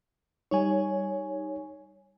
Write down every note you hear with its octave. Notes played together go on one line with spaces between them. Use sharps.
G3 D#4 C#5 G#5